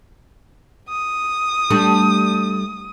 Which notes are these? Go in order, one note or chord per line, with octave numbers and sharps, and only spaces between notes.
D#6
G3 A3 D4